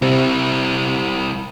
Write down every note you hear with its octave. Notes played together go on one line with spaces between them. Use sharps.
C3 G3 E4